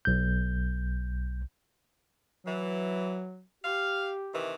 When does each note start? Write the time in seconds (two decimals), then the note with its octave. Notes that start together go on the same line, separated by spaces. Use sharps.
0.05 B1 G6
2.45 E3 F#3
3.64 G4 F5
4.33 C3 D#3 E3